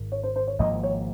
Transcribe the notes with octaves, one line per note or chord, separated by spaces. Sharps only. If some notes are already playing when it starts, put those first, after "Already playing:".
Already playing: G#1 G#2 D#3
C#5
C5
C5
C#5
G#1 G#2 F3 A#3 D#5
C#5